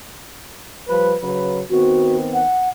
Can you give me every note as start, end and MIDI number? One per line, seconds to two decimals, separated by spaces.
0.88 1.14 53
0.88 1.14 55
0.88 1.14 71
1.21 1.60 49
1.21 1.60 54
1.21 1.60 71
1.70 2.42 51
1.70 2.42 59
1.70 2.42 60
1.70 2.17 66
2.34 2.69 78